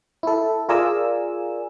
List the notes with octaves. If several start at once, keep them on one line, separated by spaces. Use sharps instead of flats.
E4 A4
F4 G#4 A#4 D5 G#5 E6